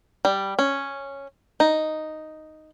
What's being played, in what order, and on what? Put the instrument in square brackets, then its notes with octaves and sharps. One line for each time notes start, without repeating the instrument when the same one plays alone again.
[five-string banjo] G3
C#4
D#4